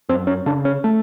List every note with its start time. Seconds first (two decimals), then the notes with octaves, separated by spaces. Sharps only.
0.09 F#2 C4
0.27 C#4
0.46 C#3 D4
0.65 C#4
0.84 A3